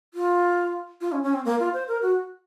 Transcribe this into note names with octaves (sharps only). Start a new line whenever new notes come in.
F4
F4
C#4
C#4
C4
A#3
F4
C5
A#4
F#4